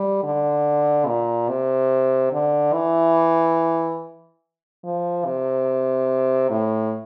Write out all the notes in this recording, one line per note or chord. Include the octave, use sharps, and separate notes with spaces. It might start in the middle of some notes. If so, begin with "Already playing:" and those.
Already playing: G3
D3
A#2
C3
D3
E3
F3
C3
A2